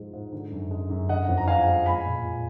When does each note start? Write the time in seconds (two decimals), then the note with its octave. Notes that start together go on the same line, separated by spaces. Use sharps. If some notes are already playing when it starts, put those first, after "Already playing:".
Already playing: G#2 F3 G#3
0.13 G#2
0.33 D3
0.52 F#2
0.71 G#3
0.90 F#2
1.09 D3 D#5 F#5
1.28 F2
1.37 A#5
1.47 F3 F5 G#5
1.66 G#3
1.86 G#3 G#5 B5
2.05 A#2
2.24 A#2